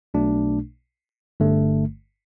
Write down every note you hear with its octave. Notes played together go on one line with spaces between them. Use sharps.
B1 B2 A3 D4
G1 G2 D3 A3